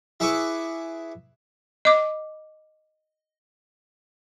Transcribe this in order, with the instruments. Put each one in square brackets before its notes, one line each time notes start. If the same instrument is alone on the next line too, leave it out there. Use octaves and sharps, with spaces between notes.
[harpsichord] E4 G#4 B4 E5 C#6 D6
[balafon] D#5 D6